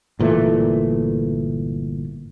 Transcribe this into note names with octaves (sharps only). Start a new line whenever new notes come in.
G1 A#2 E3 A3